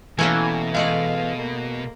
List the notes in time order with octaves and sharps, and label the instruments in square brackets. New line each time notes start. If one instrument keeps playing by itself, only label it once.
[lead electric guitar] B2 [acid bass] E3 [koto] A3 A#3 C#4 [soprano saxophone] G#5
[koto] G#3 A3 D5 [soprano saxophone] F5
[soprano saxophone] A#3